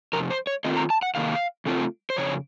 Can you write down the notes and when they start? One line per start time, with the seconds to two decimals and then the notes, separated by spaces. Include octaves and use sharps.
0.13 F2 C3 A#4
0.31 C5
0.47 C#5
0.64 D#3 A3 C4 F4 D#5
0.77 A#5
0.90 A5
1.03 F#5
1.15 C3 D#3 A#3 F5
1.66 C#3 A3 C4 F4
2.10 C5
2.17 F2 C#3 C#5